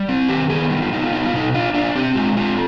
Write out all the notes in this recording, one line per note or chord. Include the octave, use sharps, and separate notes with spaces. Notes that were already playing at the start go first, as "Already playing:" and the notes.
Already playing: G3
C4
D#3 G4
B3 G#4
G3 D#4
F4
B3 D#4
F4
B3 D#4
F4
B2 D#4
D4 F4
D4 F4
C4 G4
G#3 F4
C4 F4